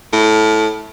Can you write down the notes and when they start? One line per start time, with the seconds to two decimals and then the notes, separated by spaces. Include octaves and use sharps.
0.13 A2